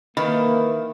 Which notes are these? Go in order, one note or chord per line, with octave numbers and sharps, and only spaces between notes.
D#3 E3 A#3 E4 B5